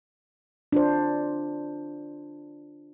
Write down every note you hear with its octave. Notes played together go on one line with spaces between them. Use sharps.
D4 F4 C5